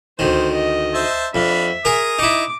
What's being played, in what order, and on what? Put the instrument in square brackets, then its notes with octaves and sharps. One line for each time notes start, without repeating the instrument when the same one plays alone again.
[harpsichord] D2 D#3 [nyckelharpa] C5
[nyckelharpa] D#5
[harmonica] C5 E5 A5
[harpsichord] F2 [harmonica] D4 F5 B5 [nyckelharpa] E5
[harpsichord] G#4 A#4 [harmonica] D#6
[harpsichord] D#4 E4 [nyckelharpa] D6